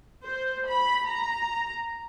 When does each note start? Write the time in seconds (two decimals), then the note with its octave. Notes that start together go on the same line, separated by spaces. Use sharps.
0.23 C5
0.66 B5
1.08 A#5